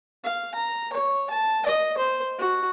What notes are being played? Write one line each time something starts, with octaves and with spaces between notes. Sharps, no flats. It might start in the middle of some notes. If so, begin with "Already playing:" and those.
F5
A#5
C#5
A5
D#5
C5
F#4